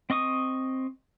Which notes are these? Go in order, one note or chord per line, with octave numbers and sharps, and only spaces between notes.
C4 D#5 C#6 D#6